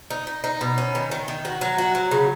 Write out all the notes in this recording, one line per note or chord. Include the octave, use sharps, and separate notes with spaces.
D#4
D#4
D#4
B2
C#4
D#3
D#3
D#3
F#4
F#3
F#4
F#3
C#3